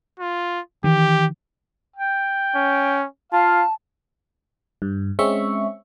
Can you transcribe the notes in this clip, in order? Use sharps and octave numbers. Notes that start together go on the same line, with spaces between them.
F4
D#3 E3 G4
G5
C#4
F4 F5 A5
G2
G#3 C4 C#4 E5 C#6